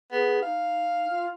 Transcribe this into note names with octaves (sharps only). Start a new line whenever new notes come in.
B3 G#4
D#4 F5
F4